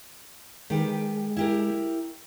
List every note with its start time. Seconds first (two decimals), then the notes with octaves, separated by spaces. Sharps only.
0.70 D#3 G#3 G4 B4
1.37 E4 G4 A#4